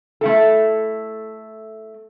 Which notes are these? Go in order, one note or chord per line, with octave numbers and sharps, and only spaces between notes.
A3 E4 A4